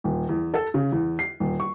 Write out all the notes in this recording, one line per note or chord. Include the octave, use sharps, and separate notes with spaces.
D#1
E2
A4
C#3
E2
C7
D#1
C#6